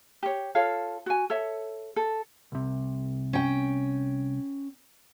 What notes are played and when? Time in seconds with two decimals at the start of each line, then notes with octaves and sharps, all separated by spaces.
0.23 G4 C#5
0.55 F4 A4 C#5 F5
1.06 F#4 G#5
1.30 A4 C#5 E5
1.96 A4
2.52 C2 C3
3.33 C#4 G5